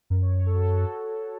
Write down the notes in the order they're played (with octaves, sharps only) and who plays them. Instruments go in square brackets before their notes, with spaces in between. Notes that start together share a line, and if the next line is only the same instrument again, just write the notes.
[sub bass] F#2 [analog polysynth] A#4
[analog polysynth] C#5
A4
F#4